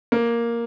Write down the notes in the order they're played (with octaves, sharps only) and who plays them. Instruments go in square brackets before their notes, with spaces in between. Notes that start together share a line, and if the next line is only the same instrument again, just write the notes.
[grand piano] A#3